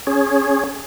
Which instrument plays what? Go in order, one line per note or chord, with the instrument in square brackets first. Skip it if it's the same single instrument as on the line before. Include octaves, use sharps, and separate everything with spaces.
[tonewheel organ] C#4 G#4